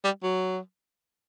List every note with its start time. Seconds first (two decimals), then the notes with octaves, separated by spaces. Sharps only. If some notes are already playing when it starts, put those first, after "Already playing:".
0.04 G3
0.23 F#3